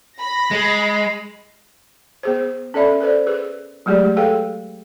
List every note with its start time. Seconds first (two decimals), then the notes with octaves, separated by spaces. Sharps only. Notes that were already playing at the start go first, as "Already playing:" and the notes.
0.18 B5 A#6
0.51 G#3
2.23 B3 G#4 C5
2.74 C#4 A4 D5 E5 B5
3.00 A4 B4 C5 D5
3.27 G#4 B4
3.86 F#3 G#3 A3 G4 G#4 D5
4.17 G#4 A4 B4 F5 G5